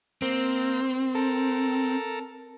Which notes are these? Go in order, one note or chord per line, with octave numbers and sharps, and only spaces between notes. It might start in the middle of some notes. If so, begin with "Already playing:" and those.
A#3 C4
A4 A#4